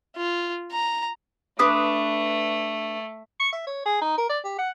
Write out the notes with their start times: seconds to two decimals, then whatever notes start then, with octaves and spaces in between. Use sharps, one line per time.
0.17 F4
0.72 A#5
1.59 A3 D4 B4 D#6
3.40 C#6
3.53 E5
3.67 C#5
3.86 G#4
4.01 D#4
4.18 A#4
4.30 D5
4.44 G4
4.58 F#5